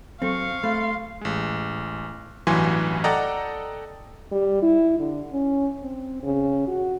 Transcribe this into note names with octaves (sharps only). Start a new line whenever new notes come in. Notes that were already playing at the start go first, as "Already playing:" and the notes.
F#3 C4 A4 F5 C#6
A3 B5 C6
A1 G#3
A1 G2 E3 F#3 G#5 C6
A4 D5 D#5 F#5 G5 A#5
G3
E4
D3
C#4
C4
C#3
F#4